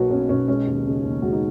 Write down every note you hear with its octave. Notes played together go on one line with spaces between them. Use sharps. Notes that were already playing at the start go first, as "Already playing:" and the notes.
Already playing: B1 B2 F#3 A#3 F#4 B4 C#5
B2 C#4
B1 C#4
G#3 C#4
D#2
C#3
D#2
G#3 F#4
D#4